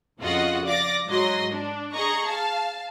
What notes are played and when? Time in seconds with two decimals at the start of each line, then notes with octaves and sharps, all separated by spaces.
0.19 F2 C#3 F4 F#4 D#5 F#5
0.65 D5 F5 D6 A6 A#6
1.07 G#2 F#3 D#5 C6
1.51 D4
1.93 G#4 D#5 A#5 C#6
2.28 F5 A5